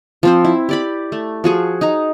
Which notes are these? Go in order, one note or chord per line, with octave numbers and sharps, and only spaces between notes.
F3 C4 C5
E4
G4 D5 B5
A3
F3 F#4 G#4
D#4 A#5